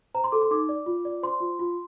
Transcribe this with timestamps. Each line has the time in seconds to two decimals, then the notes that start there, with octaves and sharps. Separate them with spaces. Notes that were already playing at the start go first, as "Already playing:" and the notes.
0.14 C5 A#5
0.24 C6
0.32 A4 D6
0.42 C6
0.51 D#4 D6
0.69 D5
0.86 F4
1.05 D5
1.23 C5 C6
1.40 F4
1.59 F4